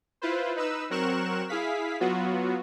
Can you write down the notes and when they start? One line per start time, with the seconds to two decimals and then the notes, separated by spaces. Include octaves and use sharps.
0.22 E4 F4 B4 C5
0.56 D#4 B4 E6
0.90 F#3 C4 A#4 C#6 F#6 E7
1.49 E4 G#4 F5 B6
2.00 F#3 B3 F4 F#4